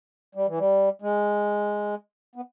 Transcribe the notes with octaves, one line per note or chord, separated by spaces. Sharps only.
G3
E3
G3
G#3
B3